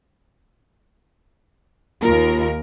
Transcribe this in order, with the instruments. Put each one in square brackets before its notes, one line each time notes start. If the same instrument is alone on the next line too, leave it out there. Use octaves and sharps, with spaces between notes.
[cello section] D#2 A#4 [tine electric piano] A#3 F4